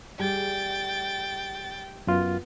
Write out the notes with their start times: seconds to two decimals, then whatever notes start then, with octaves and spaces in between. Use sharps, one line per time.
0.19 G3 A3 G#4 G5 A6
2.07 F#2 B3 F4